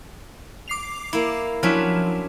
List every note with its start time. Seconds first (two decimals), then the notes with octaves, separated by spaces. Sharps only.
0.68 D6 C7 F7
1.13 A#3 E4
1.63 F3 F#3 C#4 D4 E4